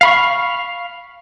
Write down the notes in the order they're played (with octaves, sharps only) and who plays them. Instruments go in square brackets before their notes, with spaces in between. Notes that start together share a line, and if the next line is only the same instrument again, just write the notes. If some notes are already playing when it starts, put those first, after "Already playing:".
[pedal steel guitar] F5 B5 C#6